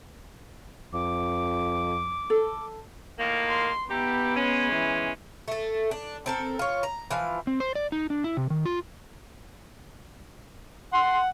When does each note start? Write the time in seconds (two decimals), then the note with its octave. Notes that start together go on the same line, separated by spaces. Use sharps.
0.93 F2 D6
2.30 A4
3.17 A2 D#3 A#3
3.50 C6
3.90 B3 D#4 E4 G4
4.36 G#3 C#4
4.72 E3
5.48 A3 A4
5.91 D4
6.26 C4 A4 A#4
6.59 F4 C#5
6.83 A#5
7.11 E3 F3 F5
7.47 C4
7.60 C5
7.75 D5
7.92 D#4
8.10 D4
8.24 E4
8.37 C3
8.50 D#3
8.66 F4
10.92 F#5 C6